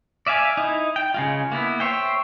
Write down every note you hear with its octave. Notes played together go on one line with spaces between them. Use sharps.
D5 E5 F5 G#5
D#4 E4
G5
C#3 G#3 F4
A#3 B3 E4
C5 C#5 E5 G5